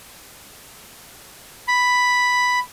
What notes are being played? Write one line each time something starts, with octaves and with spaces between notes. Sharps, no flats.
B5